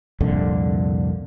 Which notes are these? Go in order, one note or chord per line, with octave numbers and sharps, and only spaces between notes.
C2 F2 A#2 D3